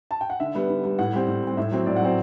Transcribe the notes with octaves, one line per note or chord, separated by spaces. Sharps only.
A5
G5
F#5
D3 E5
G3 B3
D3
G3 B3
A2 F#5
G3 C4
A2
G3 C4
A2 E5
F#3 C4
A2 D5
F#5
F#3 C4